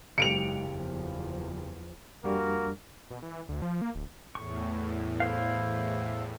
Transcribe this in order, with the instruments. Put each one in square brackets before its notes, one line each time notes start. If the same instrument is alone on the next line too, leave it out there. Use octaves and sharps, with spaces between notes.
[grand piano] F#1 G4 F5 [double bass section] G#2 F#3 [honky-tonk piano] C#7 D7 F7
[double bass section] E2 F3
[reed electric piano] F2 G3 D4 [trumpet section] A#3 F#4 A#4
[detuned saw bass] B2
E3
D2
F3
A#3
D1
[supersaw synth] E2 A2 [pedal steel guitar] C#6
[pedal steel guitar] E4 C5 F5